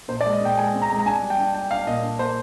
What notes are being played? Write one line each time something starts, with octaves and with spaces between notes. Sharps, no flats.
A#2 C5
D5
G#3
D#5
A#2 G5
G#3 G#5
C4
A#5
G#3
A#5
D4 G#5
G3
G5
D4
D4 G5
D4 F5
A#2 D#5
D4
A#3 C5